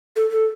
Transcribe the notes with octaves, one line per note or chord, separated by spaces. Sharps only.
A4
A4